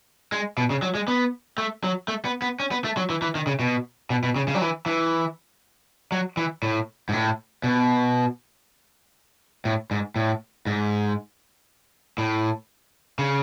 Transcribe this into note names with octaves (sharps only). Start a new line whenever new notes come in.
G#3
B2
C#3
F#3
G#3
B3
A3
F#3
A3
B3
B3
C#4
B3
A3
F#3
E3
E3
D#3
C#3
B2
B2
B2
C#3
C#3
F#3
E3
E3
F#3
E3
A2
G#2
A2
B2
A2
G#2
A2
G#2
A2
C#3